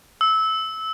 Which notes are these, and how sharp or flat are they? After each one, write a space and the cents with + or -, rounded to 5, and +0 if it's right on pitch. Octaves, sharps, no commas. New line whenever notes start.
E6 -20